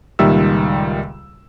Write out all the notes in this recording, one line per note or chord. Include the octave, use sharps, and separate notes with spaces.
C#2 A#2 D#3 G3 E5 E6